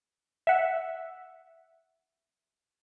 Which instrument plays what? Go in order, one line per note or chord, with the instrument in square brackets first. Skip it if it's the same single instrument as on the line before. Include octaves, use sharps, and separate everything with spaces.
[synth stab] E5 F#5